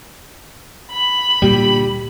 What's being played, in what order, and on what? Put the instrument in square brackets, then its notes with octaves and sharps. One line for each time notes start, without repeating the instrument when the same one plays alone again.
[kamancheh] B5
[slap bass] D2 A#2 G3 [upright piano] G4